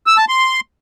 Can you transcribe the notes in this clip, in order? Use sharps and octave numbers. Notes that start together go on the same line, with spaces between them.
E6
A5
C6